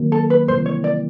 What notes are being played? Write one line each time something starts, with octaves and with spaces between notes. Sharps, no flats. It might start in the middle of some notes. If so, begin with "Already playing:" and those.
Already playing: D#3 F#3 A#3
A4
B4
C3 E3 G3 C4 C5
C#5
D5